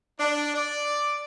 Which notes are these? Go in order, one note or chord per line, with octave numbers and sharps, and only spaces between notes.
D4
D5